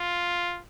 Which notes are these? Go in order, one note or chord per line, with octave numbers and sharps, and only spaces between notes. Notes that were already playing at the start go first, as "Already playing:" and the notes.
Already playing: F4